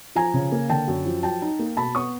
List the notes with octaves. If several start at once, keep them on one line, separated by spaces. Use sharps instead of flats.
F3 G#5 A#5
C#3
A#3
D3 G5 A5
F#2
F3
F#3 G5 A5
D#4
A#3
B2 A5 B5
B3 C#6 D#6